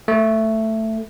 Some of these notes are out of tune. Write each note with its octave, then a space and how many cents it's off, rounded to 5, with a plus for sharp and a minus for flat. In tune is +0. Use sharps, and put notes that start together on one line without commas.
A3 +10